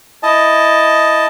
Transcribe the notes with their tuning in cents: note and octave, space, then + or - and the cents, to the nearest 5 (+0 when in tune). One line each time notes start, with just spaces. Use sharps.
E4 +0 D#5 +0 A5 +0